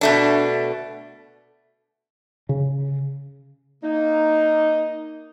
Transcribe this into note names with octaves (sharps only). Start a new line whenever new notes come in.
B2 A3 D4
C#3
A#3 D#4